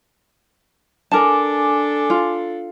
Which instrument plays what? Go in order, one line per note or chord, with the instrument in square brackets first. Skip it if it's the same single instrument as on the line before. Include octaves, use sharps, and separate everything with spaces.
[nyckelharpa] D4 A4 [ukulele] A#4 A5 [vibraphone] G#5 D6
[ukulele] F4